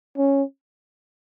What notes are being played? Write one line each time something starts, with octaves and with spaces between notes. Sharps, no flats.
C#4